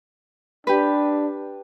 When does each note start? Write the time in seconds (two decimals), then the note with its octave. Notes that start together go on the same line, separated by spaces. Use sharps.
0.67 D4 G4 B4